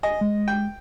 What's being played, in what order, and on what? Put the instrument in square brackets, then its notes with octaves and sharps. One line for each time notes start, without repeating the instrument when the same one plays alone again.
[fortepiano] D#5 [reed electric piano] G#5
[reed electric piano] G#3
[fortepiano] G5